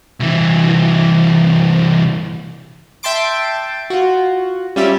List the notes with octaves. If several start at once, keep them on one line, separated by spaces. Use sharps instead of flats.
C2 E3
E5 G5 A5 C6 D6 D7
F4 F#4
G3 C#4 F4 D5 E5